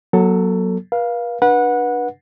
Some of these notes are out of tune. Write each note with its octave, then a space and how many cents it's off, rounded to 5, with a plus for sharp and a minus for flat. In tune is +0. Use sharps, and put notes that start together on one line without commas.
F#3 +0 A#3 +45 A4 +15
B4 -45 F5 +0
D4 +10 B4 -25 F#5 -15